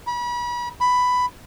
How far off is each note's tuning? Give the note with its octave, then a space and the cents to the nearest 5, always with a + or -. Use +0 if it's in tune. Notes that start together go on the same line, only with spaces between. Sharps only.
B5 -35
B5 +10